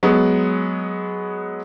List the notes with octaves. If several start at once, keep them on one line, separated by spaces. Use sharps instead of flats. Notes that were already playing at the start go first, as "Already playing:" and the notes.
F#3 G#3 B3